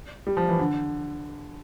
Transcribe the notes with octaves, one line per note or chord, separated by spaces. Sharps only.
G3
F3
E3
D3